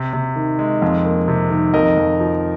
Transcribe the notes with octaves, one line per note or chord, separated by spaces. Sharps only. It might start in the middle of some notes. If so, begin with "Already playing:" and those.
Already playing: C3
C3
D#3
G#3
F2
A#3
C3
D#3
F2 A#4 D#5
F2
F3